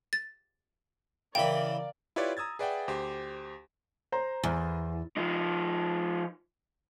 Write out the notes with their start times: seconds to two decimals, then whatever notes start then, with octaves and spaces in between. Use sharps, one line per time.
0.13 A6
1.35 C#3 E3 A#4 D5 F5 G5 B5
2.16 E4 F4 G4 B4 C#5 D5
2.37 A#5 D#6 E6 G#6 A6
2.59 G#4 B4 D5 E5 F#5 G5
2.88 D2 G4 C5
4.12 C5 A#5
4.44 E2
5.17 F3 D#4